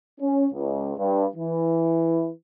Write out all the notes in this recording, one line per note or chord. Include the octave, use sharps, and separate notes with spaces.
C#4
C#2
G2
E3